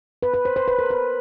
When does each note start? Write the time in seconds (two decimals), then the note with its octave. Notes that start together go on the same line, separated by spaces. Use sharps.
0.23 B4
0.34 B4
0.45 C5
0.56 C5
0.68 B4
0.79 A#4
0.91 B4